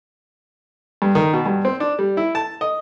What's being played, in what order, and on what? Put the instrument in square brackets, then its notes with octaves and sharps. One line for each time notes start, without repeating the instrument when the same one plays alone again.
[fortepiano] G2
D#3
B2
G2
C4
D4
G3
E4
A5
D#5